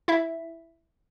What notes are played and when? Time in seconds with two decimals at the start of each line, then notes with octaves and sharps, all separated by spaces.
0.08 E4 E5